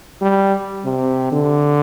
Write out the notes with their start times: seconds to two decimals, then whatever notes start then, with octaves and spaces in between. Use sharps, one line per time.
0.21 G3
0.85 C3
1.32 D3